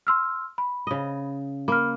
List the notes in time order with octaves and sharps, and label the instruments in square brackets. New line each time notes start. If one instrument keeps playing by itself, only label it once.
[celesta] C6 E6 F6
B5
[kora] C#3 D#5
[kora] A#3 [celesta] B5 F6